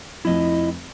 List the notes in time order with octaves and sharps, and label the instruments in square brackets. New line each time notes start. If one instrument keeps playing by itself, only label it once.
[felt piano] F1 F2 F3 [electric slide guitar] E4 D#5